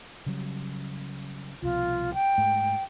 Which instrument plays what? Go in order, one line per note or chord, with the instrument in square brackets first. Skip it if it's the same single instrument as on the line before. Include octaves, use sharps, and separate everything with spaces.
[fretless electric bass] C#3 F#3 G3
[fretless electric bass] C2 B2 F3 [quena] F4
[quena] G5
[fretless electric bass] G#2 A3